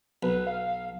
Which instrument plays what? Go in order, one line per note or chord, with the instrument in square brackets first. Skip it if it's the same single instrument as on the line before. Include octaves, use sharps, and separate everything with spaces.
[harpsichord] B1 [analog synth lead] B4
[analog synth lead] F5